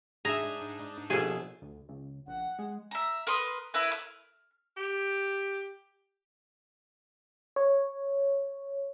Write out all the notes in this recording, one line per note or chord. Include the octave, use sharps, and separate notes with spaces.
G#2 D4 D#4 G#4 E5 A#5
A#1 D#2 B2 G#4 A4
D2
C#2
A#1 F#5
G#3
E5 A#5
A#4 B4 C6 D#6
E4 A#4 B4 E5
F6
G4
C#5